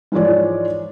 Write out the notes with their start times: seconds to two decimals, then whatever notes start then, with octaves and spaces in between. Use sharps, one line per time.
0.12 G#2 E3 F3 G#3 C#5 D5